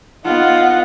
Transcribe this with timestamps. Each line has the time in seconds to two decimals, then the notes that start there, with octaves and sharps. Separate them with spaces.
0.25 B3 D#4 F4 F#5